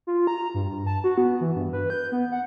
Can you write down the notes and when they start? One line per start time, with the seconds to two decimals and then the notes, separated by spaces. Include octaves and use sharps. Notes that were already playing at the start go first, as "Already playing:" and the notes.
0.07 F4
0.27 A#5
0.54 G2
0.86 A5
1.04 F#4
1.18 B3
1.41 E3
1.55 G2
1.73 B4
1.90 G6
2.12 B3
2.32 F#5